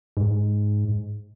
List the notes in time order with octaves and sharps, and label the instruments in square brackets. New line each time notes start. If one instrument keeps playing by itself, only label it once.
[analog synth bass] G#2